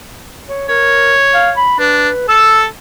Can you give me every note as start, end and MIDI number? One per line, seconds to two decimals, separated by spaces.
0.49 0.67 73
0.69 1.15 70
0.69 1.64 73
1.34 1.50 77
1.57 1.79 83
1.79 2.09 62
1.79 2.26 71
2.29 2.66 69
2.29 2.62 88